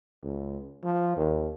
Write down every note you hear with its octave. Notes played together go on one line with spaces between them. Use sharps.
C#2
F3
D#2